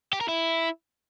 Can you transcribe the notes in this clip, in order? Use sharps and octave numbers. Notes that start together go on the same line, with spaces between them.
G4
A#4
E4